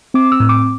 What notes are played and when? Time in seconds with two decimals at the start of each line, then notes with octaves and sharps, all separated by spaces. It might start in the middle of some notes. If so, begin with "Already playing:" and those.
0.14 C4 D6
0.32 E6
0.40 A2
0.49 D6